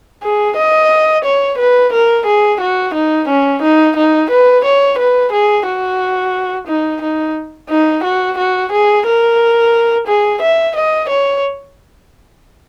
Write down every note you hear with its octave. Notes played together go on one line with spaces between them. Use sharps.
G#4
D#5
C#5
B4
A#4
G#4
F#4
D#4
C#4
D#4
D#4
B4
C#5
B4
G#4
F#4
D#4
D#4
D#4
F#4
F#4
G#4
A#4
G#4
E5
D#5
C#5